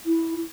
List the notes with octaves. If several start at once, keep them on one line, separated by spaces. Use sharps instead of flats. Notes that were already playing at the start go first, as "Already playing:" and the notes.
E4